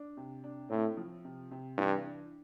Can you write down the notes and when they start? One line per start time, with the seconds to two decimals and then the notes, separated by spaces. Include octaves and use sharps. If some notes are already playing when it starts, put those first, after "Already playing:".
Already playing: D4
0.17 C3
0.44 D4
0.70 A2 C4
0.97 F3
1.25 C3
1.51 C3
1.78 G2 E3
2.04 D4